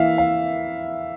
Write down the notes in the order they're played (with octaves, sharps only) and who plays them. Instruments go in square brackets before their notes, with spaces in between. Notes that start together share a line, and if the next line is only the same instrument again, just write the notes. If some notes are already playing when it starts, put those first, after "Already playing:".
Already playing: [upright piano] E3 A#3 E4 [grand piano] E5 F5
[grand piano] F5